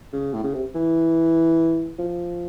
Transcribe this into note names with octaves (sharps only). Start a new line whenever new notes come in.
C#3
A2
C#3
C3
E3
F3